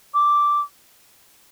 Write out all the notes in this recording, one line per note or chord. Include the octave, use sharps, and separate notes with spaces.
D6